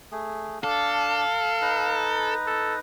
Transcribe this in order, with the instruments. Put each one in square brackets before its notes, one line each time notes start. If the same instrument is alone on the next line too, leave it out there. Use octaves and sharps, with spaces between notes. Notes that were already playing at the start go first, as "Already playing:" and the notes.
[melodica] A3 G#4
[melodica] D4 [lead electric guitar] A4 [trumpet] F5
[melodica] D#4 B4 A#5
[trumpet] A4